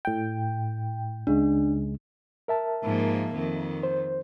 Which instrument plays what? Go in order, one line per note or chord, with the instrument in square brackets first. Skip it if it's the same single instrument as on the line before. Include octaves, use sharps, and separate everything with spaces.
[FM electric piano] A2 G5
[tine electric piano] C#2 C#3 G#3 [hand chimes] D4
[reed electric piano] A#4 E5 A5
[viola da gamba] G#2 F3 A#3
F2 D#3
[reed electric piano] C5